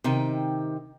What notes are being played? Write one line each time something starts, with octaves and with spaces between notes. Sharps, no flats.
C3 D#3 D#4 G5